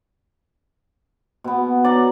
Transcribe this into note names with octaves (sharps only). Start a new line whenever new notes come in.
B2 B3
D5 F#5 A#5